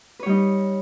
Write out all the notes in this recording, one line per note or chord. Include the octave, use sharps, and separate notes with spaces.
G3 D#4 B4 C#5